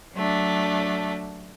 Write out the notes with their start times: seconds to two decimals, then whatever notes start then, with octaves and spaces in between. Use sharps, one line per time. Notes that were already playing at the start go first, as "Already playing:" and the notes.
0.15 F#3 A3 D4